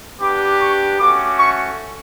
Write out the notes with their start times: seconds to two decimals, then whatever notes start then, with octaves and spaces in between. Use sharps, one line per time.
0.20 B3 D4 G4 D6
0.60 C#6
0.99 A3 C#4 F#4 D6
1.38 C#6